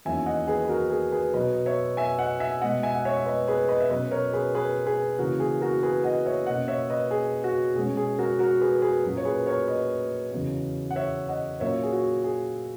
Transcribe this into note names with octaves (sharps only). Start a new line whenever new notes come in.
E2 D#3 F#3 A#3 C#4 E5 G#5
D#5 F#5
G#4 B4
B4
F#4 A#4
G#4
G#4 B4
B2 F#3 B3 B4 D#5
C#5 E5
E5 G#5
D#5 F#5
E5 G#5
B2 G#3 B3 D#5 F#5
E5 G#5
F#5
C#5 E5
E5
B4 D#5
G#4 B4
B4 D#5
E5
B2 F#3 C#4 B4 D#5
A#4 C#5
G#4 B4
G#4 B4
G#4 B4
C#3 E3 A#3 F#4 A#4
G#4
F#4 A#4
G#4 B4
D#5 F#5
C#5 E5
B2 A#3 C#4 D#5 F#5
C#5 E5
B4 D#5
G#4
F#4
B2 G#3 C#4 G#4
G#4
F#4 A#4
F#4 A#4
G#4 B4
G#4 B4
A#2 F#3 A#3 C#4
C#5
G#4 B4
A#4 C#5
B4 D#5
E2 C#3 F#3 B3
F#5
C#5 E5
D#5 F#5
A#2 F#3 A#3 C#4 C#5 E5
G#4
F#4
G#4